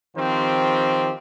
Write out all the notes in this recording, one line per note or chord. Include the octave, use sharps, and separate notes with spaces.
D#3 F3 C4 G4 C5